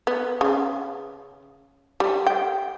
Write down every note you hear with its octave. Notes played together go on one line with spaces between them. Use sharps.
B3
C#3
G3
G5